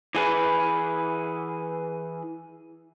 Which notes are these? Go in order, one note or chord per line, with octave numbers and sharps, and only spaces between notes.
E3 G#4 B4